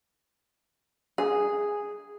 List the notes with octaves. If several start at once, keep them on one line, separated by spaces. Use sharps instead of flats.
G#4